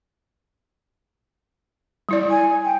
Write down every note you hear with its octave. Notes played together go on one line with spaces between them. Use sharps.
G3 E4 D5
G#5
G5